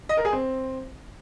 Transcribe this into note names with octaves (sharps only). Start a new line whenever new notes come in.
D#5
A#4
G#4
C4